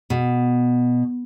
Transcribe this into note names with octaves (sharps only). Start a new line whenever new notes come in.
B2